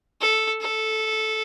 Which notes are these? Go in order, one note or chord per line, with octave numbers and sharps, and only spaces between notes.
A4
A4